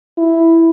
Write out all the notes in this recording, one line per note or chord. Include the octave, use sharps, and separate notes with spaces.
E4